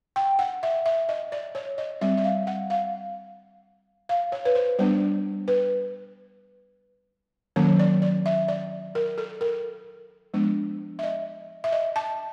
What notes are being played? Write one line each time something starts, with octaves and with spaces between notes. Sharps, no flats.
G5
F#5
E5
E5
D#5
D5
C#5
D#5
G3 C4 E5
E5
F5
F#5
F5
F5
C#5
B4
C5
G3 B3 D4 C5
B4
D#3 F#3 A#3 C#4 C#5
D5
D5
E5
D5
A#4
A4
A#4
F3 G#3 B3 D4
E5
D#5
E5
D#5
A5